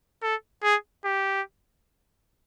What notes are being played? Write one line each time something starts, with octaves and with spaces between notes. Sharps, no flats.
A4
G#4
G4